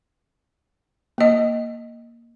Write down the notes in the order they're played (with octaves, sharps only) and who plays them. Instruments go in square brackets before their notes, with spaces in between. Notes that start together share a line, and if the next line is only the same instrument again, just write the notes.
[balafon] A#3 D#5